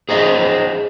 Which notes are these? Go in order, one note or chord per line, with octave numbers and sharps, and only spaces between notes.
G#4 C5 D#5 E5